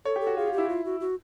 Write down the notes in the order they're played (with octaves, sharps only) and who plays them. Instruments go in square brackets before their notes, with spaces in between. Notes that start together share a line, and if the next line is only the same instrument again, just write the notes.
[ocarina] A4 [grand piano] C#5
[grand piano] G4 [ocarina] A4
[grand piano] F#4
[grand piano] F4 [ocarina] G#4
[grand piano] F4
[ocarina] G4
[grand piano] E4
[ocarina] F4
F#4
F#4